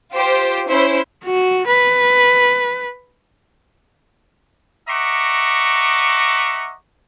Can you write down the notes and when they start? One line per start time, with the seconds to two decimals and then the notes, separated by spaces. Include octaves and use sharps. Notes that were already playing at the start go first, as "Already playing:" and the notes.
0.12 F4 G4 C5
0.69 C#4 E4 C5
1.25 F#4
1.67 B4
4.88 D#5 E5 F#5 A#5 C#6 D6